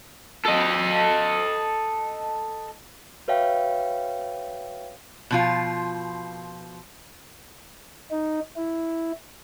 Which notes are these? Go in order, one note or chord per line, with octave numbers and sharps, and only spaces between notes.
A4 D#5
F#4 B4 C#5 E5 F5 G5
B2 F3 F4
D#4
E4